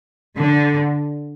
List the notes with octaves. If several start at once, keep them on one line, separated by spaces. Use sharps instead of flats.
D3